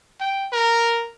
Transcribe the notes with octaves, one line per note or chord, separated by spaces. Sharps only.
G5
A#4